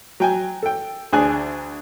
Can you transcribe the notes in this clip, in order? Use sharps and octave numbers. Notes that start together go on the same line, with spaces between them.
F#3 G5 G#5
A4 G5
D2 D4 G#4 G#5 F#6